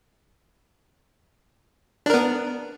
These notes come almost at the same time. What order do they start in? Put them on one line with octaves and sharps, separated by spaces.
D4 A#4 B3